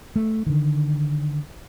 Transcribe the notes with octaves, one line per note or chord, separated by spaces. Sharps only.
A3
D3 D#3